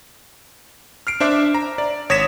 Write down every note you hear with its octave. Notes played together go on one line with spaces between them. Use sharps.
F6 C7 D7
D4 C5 E5 D6
A#5
D5
G#1 C#5 D#6 A#6 B6 E7